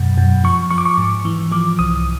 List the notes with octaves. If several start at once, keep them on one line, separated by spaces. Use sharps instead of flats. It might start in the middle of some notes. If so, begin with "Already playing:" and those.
Already playing: F#2 B2
F#2
F3 C#6
F3 C#6
D6
C#6
G#2
E3
F3 D6
C2 D#6